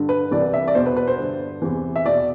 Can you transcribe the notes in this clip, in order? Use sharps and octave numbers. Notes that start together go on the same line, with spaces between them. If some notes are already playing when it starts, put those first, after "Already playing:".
Already playing: G2 D3
B4
C2 C3 E3 D5
E5
D5
E2 B2 C5
B4
B4
C5
G2 D3
E2 C3 E3
E5
E2 B2 D5